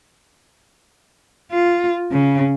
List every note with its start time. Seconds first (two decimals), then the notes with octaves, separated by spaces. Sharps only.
1.52 F4
2.11 C#3